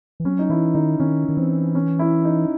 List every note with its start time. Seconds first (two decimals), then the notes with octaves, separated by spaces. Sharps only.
0.20 E3
0.25 F#3 C#4
0.39 D#4
0.50 E3 E4
0.75 D#3 D#4
1.00 D#3 C#4
1.29 D#3
1.37 E3 C4
1.75 C#4
1.99 E4
2.25 D#4